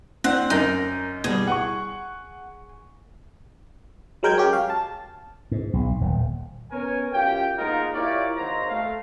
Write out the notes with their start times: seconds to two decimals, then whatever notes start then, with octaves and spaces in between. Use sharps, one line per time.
0.24 C4 D4 F#5
0.50 F#2 D#4 A#4 A#6
1.24 B2 G3 G#4
1.47 F#5 C#6
4.23 F#3 G#3 A#4 G5 G6 G#6
4.38 C#4 G4
4.53 F5
4.70 A5
5.52 G#2
5.73 B1
6.01 D#1
6.71 B3 C#4 A#4 C#5 G#5
7.14 F#2 F4 G4 G5
7.58 G#2 A#3 B3 D#4 F4 A#4
7.94 E4 F4 G4 A#4 C#5 D5
8.37 G#1 D#3 F#3 A#3 C5 A#5
8.69 A3 F5